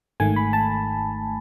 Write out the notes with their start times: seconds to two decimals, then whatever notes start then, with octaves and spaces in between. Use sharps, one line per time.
0.20 G#1 G#2 D#3 A3 G#5
0.36 B5
0.53 A5